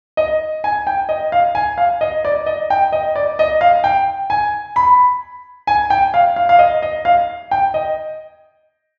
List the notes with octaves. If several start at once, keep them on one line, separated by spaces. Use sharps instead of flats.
D#5
G#5
G5
D#5
F5
G#5
F5
D#5
D5
D#5
G5
D#5
D5
D#5
F5
G5
G#5
B5
G#5
G5
F5
F5
F5
D#5
D#5
F5
G5
D#5